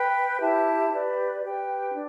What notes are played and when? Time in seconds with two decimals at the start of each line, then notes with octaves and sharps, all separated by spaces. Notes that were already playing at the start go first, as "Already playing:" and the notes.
Already playing: B4 G5 B5
0.41 E4 G4 E5 A5
0.91 G4 B4 D5
1.42 G4 B4 G5
1.93 D4